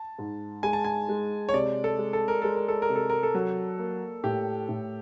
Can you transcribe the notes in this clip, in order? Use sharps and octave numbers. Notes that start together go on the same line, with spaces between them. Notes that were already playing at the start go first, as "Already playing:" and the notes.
Already playing: A5
G#2
G#3 G#5
A5
G#5
G#3
C#5
C3 D5
A4
G#3
A4
A#4
G#3 A4
A#4
A4
A#4
C3
A4
A#4
A4
F#3
A#3
A2 G4
A2